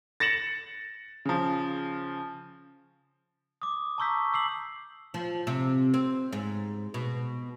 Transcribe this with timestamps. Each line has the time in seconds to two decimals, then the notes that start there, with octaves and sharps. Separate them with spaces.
0.20 A6 A#6 C#7 E7 F#7
1.25 C#3 F3
3.62 D6 D#6
3.98 A5 A#5 C#6 E6 G6 B6
4.33 D6 E6 C7 F#7
5.14 F3
5.47 C3
5.94 C4
6.33 G#2
6.94 B2